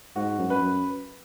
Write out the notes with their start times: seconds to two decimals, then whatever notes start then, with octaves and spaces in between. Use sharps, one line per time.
0.16 G#2 F#4
0.39 F#2
0.50 B4
0.62 F#2